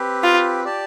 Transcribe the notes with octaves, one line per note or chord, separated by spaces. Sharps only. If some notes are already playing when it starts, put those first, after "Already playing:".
Already playing: C4 G4 B4
F4
G4 D5 A5